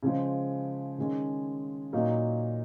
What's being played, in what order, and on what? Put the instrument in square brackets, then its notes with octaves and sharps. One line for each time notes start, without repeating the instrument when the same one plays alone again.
[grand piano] C#3 F3 G#3
D#3 G#3 C#4
A#2 F#3 A#3 D#4